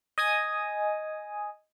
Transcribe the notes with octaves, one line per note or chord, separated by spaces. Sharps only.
D#5 G#5 D#6